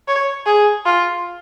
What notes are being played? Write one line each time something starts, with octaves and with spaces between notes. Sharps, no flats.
C#5
G#4
F4